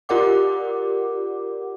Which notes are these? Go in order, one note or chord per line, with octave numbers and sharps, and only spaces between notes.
F4 G4 A#4 D5 F#5 D6